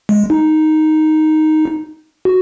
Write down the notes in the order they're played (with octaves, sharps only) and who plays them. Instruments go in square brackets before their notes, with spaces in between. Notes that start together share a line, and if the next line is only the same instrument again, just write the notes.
[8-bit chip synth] G#3
D#4
F#4